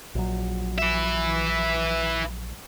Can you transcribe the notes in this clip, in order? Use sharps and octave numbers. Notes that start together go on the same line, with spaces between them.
A#1 F#3
B4 E5